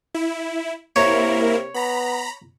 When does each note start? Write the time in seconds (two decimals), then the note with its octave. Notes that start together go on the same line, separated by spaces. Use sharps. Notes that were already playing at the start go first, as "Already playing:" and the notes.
0.14 E4
0.96 C3 A#3 E4 A#4 C#5
1.74 B3 A#5 B5